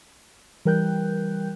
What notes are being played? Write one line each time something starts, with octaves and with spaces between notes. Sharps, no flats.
E3 G3 A#4 G5 F#6 G6